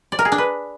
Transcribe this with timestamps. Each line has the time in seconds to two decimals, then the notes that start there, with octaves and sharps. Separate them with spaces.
0.12 D5
0.19 A#4
0.25 G#4
0.32 D4
0.38 B4